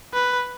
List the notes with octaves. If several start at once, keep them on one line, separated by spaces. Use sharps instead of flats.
B4